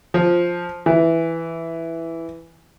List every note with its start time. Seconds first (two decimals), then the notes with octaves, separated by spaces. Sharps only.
0.14 F3
0.86 E3